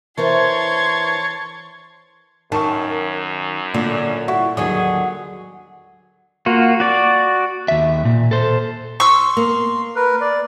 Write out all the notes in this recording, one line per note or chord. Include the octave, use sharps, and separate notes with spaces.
E3 A#4 C5 C#5 A5 C6 G#6
F#2 D#3 A5 C#6
A#2 D3
E4 F#4
D#2 D3 F#3 G#4 D#5 D#6
A#3 F4 F#4
F#4 D5
D#2 E5
A#2
A4 C5
C6 C#6 E6
A#3
A#4 B4
D5